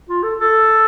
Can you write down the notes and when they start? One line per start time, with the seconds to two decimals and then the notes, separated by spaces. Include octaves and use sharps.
0.09 F4
0.23 A4
0.39 A4